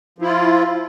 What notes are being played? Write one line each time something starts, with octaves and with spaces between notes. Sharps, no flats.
F3 E4 F4